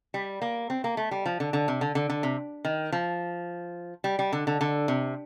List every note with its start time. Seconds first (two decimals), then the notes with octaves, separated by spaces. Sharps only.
0.14 G3
0.42 A#3
0.70 C4
0.84 A#3
0.97 A3
1.11 G3
1.26 F3
1.40 D3
1.53 D3
1.68 C3
1.81 D3
1.95 D3
2.10 D3
2.23 C3
2.65 D#3
2.92 F3
4.04 G3
4.19 G3
4.33 D3
4.47 D3
4.61 D3
4.88 C3